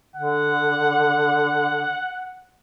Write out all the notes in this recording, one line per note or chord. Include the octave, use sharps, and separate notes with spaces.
D3 F#5